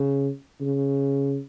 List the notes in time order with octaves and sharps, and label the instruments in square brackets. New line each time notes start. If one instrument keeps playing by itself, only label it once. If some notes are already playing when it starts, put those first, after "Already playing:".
Already playing: [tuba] C#3
C#3